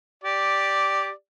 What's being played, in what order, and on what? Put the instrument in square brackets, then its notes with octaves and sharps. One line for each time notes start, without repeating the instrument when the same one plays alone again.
[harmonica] G4 D5